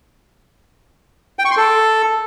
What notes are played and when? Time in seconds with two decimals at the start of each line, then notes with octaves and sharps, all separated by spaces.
1.39 G5
1.45 C#6
1.51 C6
1.57 A4